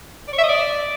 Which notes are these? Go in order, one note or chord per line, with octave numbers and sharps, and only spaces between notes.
D5
C#5
E5
D#5
D5